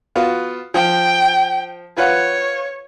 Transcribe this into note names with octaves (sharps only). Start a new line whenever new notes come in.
B3 F4 F#4
F3 G5
F4 B4 C#5 F#5